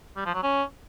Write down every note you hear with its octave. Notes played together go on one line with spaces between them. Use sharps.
G3
F3
F#3
C#4